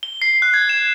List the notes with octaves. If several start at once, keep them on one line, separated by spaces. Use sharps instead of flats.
G7
C7
F#6
G#6
E7